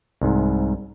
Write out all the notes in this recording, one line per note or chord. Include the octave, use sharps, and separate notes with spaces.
C2 G#2